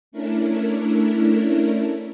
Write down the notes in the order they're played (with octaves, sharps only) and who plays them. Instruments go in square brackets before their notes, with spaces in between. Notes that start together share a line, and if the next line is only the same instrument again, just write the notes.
[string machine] A3 C#4 D4 E4 A#4